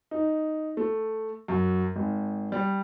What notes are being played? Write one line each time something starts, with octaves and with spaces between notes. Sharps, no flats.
D#4
A3
F#2
G#1
G3